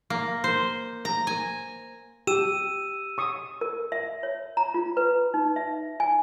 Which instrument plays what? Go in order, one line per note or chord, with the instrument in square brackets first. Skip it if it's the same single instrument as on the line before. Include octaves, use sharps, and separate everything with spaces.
[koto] A#3
C5
A#5
G#5
[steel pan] G4 [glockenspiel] E6 D#7 E7
[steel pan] C#6 D#6
[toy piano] A#4
E5
C#5
A#5
F4
B4
D#4
E5
G#5